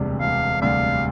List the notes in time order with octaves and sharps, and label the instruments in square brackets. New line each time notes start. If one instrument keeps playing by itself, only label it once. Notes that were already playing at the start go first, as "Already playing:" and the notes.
Already playing: [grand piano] E1 D2 C3 G3
[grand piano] E1 [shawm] F5
[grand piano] D2 C3 G3 [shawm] F5